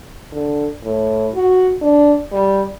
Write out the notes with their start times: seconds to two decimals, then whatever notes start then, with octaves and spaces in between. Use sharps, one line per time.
0.32 D3
0.83 A2
1.34 F#4
1.81 D4
2.32 G3